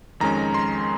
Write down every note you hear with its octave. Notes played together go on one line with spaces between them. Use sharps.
F2 D#3 G#3 C#4 A#5
C6